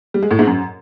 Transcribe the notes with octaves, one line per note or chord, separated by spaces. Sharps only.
G3
G#3
A2
G#2
F#2